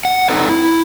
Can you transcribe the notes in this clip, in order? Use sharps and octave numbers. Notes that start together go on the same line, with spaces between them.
F#5
C4 D4 D#4 A4 B4
E4